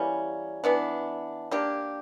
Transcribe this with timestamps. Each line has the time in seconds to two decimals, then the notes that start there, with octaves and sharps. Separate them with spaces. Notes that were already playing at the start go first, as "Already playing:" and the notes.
Already playing: E3 G3 A#3 C#4
0.64 E3 B3 D4
1.51 A#3 D4 G4